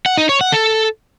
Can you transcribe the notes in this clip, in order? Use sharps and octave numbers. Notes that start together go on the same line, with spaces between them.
F#5
D#4
C#5
F#5
A4